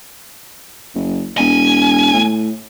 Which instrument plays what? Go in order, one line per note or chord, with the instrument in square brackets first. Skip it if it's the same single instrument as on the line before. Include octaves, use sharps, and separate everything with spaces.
[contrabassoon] F#1
[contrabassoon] E1 [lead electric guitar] G#5
[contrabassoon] A2